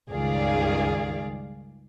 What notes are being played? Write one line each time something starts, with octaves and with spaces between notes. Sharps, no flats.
C#2 G2 D#3 G#4 D5 F5